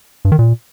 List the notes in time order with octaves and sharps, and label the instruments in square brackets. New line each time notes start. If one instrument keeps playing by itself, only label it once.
[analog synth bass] G2
D#3
A#2